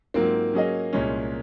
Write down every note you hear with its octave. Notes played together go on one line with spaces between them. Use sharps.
G#2 F#3 A#3 C4 F4
F#3 C#4 G#4 D#5
C2 A#2 G#3 C#4